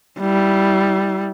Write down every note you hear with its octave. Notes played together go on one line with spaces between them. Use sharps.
G3 E4